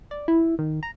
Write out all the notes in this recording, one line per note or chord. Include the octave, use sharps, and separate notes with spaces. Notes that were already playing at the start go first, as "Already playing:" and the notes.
D5
E4
D#3
A#5